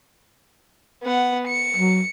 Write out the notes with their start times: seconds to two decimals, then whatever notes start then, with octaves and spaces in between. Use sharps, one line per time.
1.03 B3 F#5
1.48 C#7
1.77 F#3